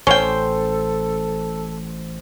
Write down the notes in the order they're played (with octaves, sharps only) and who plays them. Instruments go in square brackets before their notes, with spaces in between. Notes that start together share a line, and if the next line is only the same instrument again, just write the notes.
[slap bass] A1 [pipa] C#4 G5 [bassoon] A4 [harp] C5